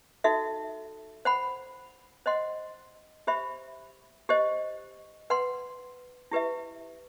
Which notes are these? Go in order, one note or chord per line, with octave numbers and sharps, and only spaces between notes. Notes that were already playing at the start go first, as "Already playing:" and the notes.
D#4 F#4 A4 E5
C5 F#5 B5
C5 D#5 F#5 C6
G4 C5 E5 B5
G4 C5 D#5
B4 F#5 C6
E4 G4 B4 E5